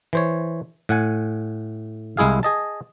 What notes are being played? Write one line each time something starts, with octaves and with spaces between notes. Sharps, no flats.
E3 C5 C#5
A2 F#5 G#5
C2 G#3 E4 G#4 F5
G#4 D#5 A5